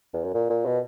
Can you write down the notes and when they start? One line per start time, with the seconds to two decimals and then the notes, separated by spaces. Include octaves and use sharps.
0.14 E2
0.24 F#2
0.34 A#2
0.50 A#2
0.66 B2